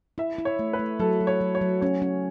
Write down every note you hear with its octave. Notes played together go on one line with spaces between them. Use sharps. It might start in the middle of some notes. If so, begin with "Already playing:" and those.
E4 E5
E4
C#5
A3
B4
A3
F#3 A4
F#3
C#5
F#3
C#5
F#3
C#4 C#5
C#4